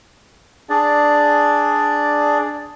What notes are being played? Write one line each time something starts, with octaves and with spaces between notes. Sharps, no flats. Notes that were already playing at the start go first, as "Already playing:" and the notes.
D4 G#4 D5